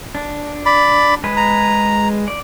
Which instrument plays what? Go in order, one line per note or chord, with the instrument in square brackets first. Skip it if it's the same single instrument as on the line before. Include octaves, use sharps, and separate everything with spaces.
[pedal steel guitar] D4
[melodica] D5 B5
[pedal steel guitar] G#3 G#4 B4
[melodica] A#5
[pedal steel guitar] D5